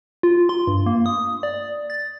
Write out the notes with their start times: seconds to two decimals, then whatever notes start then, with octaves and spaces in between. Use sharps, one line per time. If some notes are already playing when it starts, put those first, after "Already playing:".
0.23 F4
0.49 C6
0.67 G2
0.86 A#3
1.06 D#6
1.43 D5
1.90 A6